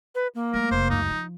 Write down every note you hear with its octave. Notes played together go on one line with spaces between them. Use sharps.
B4
A#3
G3 A3 A#4
F1 C5
C#2 F#2 D#4
F3